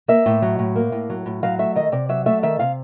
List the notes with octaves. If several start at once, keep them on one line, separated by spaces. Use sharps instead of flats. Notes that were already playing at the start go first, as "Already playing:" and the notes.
A#3 E5
A2
F#3
A2
A#3
A2
F#3
A2
F#3 F5
A3 E5
D#3 D#5
C3 D5
F#3 E5
A3 E5
D#3 E5
C3 F5